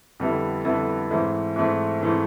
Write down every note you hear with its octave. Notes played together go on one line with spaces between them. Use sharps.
F2 D3 G3 B3 E4
F2 D3 G3 B3 E4
G#2 E3 A3 C4
G#2 E3 A3 C4
G#2 E3 A3 C4